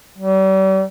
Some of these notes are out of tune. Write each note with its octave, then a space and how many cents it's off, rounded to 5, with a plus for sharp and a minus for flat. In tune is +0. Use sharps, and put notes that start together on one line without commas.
G3 -40